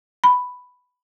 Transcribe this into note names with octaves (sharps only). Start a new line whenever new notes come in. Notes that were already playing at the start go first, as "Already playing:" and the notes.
B5